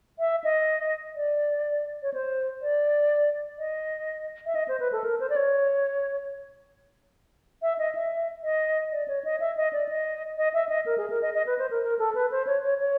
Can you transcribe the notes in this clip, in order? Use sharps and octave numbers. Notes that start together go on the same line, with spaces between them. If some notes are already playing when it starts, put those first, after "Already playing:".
E5
D#5
D5
C#5
C5
D5
D#5
E5
D#5
C5
B4
A4
A#4
C5
D5
C#5
E5
D#5
E5
D#5
D5
C#5
D#5
E5
D#5
D5
D#5
D#5
E5
D#5
A#4
G#4
A#4
D#5
D#5
B4
C5
A#4
A#4
A4
B4
C5
C#5
C#5
C#5